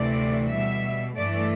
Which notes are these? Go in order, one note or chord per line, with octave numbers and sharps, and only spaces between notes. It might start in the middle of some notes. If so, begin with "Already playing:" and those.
Already playing: D2 C3 E3 A3 D5
B2 G3 E5
G2 E3 A3 D5